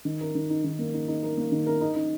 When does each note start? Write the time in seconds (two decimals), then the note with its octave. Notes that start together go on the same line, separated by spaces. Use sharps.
0.05 D#3
0.21 A#4
0.35 D#3
0.50 D#4
0.64 D#3
0.79 A#3
0.94 D#4
1.08 D#4
1.23 A#4
1.37 A#3
1.52 D#3
1.66 A#4
1.81 D#4
1.95 D#4